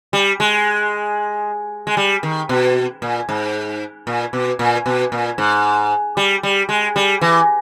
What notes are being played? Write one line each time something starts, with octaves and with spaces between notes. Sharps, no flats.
G3
G#3
G#3
G3
D#3
B2
A#2
G#2
A#2
B2
A#2
B2
A#2
G#2
G3
G3
G#3
G3
E3